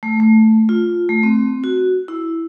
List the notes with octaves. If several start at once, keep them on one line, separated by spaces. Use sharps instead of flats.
A3
A3
F4
A3
C4
F#4
E4